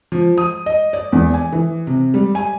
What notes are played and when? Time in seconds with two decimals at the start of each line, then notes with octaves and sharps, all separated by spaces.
0.12 F3
0.38 D#6
0.66 D#5
0.93 D5
1.12 E2
1.34 G#5
1.52 E3
1.87 C3
2.14 G3
2.35 G#5